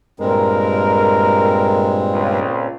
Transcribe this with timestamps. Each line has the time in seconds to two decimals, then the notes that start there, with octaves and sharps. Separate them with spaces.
0.20 G2 A#2 G#3 C4 A#4
2.12 C#2